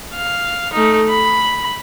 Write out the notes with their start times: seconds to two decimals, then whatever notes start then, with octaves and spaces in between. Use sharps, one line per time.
0.15 F5
0.73 A3 D#4
1.10 B5